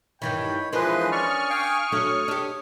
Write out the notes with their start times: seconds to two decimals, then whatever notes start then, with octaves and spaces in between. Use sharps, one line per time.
0.22 G2 D#3 E3 C#5 G5 B5
0.73 E3 F3 G#3 D4 A#4 B4 C6 D#6
1.12 C#4 D5 C#6 F6
1.50 F5 G5 G#5
1.92 F#3 A3 D4 C#5
2.28 D4 G4